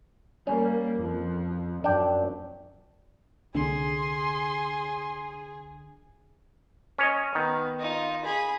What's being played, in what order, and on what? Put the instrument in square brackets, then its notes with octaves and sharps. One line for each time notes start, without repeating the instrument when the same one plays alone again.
[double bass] G3 A#3 [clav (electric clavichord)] C#4
[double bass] F2 F3
[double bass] F#2 [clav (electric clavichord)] D4 G5
[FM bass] C2 [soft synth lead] D3 [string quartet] G#4 [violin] C6
[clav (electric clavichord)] C#4 C#5 D#5
[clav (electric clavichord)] D#3 [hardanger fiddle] B3
[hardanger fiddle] D#4 F4
G#4 B5